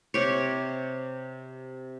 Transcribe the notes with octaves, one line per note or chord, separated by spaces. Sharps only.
C3 G4 C#5